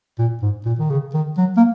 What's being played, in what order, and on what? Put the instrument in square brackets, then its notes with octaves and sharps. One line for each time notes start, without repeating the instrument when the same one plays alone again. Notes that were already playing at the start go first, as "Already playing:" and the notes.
[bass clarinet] A#2
G#2
A#2
D#3
C#3
D#3
F#3
A#3